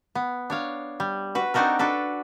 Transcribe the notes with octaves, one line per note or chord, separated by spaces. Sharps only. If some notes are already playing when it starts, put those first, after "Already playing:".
B3
D4 C#5 F5
G3
F#4 B4
C4 D4 D#4 F#4 A4 A#4
D4 F#4 A4 B4